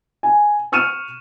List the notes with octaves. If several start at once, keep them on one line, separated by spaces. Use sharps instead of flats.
G#5
C#6 F6 C#7 D#7 E7